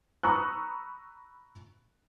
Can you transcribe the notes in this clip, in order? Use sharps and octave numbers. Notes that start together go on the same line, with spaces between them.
A#5 B5 C#6 D#6 E6 F#6